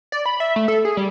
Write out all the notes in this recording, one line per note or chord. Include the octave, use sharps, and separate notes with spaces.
D5
B5
E5
A3
A4
G#4
G3